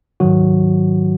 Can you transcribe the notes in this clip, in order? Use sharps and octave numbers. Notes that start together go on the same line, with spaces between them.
G#2 D#3 F#3 F#4